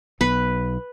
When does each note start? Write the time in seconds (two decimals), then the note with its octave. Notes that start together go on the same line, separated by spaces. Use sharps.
0.21 B1 B3 B4